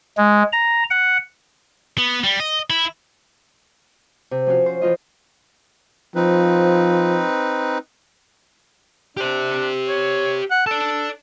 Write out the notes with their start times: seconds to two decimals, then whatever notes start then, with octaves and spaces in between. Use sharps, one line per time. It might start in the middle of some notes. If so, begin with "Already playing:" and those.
0.17 G#3
0.52 A#5
0.90 F#5
1.98 B3
2.24 G3
2.40 D#5
2.70 E4
4.31 C3
4.47 F3 C#4 F4 F#4 F5
4.66 C5
4.81 E3 F3 F4 D#5
6.15 F3 C4 D#4 B4
9.17 D4 G4 C5
9.88 C#5
10.51 F#5
10.67 A4 D5 A5